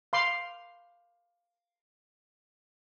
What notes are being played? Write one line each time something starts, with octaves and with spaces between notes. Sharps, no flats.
F5 B5 C6 D6